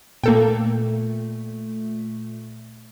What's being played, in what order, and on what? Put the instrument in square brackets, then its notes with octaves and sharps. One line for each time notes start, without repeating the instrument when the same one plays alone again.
[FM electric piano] A#2 A3 [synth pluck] A#3 A4 G5